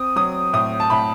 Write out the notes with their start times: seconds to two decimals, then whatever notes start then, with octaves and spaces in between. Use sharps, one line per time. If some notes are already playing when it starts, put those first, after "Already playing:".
Already playing: C4 D#6
0.16 F#3 D#6
0.53 A2 D#6
0.80 A5
0.90 A2 B5